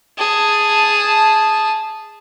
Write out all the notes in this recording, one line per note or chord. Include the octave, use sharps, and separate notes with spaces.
G#4 A5